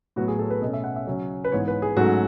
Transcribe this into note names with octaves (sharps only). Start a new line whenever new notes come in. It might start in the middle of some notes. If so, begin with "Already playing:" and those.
A2 F#3 B3 F#4
G#4
A4
B4
B2 A3 C#4 D#5
E5
F#5
E5
C#3 F#3 C#4
B4
G#2 E3 B3 C#5
B4
G#4
G#2 F#3 A3 C#4 F#4